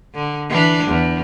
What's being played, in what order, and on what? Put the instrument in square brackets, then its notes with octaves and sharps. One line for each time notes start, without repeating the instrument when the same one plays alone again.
[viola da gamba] D3
E3 D4
E2